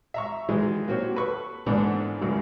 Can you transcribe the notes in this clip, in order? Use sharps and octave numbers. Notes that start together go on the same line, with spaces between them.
E5 A#5 C#6
D#3 E3 F#3 G#3 D#4
F#3 A#3 C4 F#4 G4 C#5
A4 B4 C#6
G#2 D3 E3 A#3 B3 D4
C#2 F#2 D#3 F#3 G3